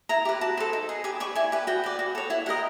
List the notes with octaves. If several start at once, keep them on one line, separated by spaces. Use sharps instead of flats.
E4 A#5
G4 B4
F#4 A5
A4 C5
D#4
G#4 B4
G4 G#5
B4 D5 C#6
E4 G#5
G4 B4
F#4 G5
B4 D5
F#4
A4 C#5
E4 F#5
G4 A#4 D#5 F#5